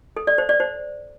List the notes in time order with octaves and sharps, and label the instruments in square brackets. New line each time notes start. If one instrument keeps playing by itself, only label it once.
[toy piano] A4
D5
C5
D5
C5